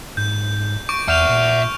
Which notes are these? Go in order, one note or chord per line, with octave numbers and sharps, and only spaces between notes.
G#2 G6
C#6 D6 D7
E2 E5 F#5 F6 G6 F7
A#2